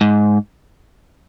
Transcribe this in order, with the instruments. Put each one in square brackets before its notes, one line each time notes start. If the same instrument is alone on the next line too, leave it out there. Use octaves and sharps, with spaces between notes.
[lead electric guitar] G#2